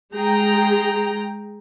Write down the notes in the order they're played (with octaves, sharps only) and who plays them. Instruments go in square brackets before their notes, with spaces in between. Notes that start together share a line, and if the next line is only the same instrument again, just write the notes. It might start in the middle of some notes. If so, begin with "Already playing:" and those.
[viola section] G#3 G#4 G5 A#5